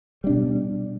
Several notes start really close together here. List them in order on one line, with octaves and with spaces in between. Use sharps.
G3 D4 B2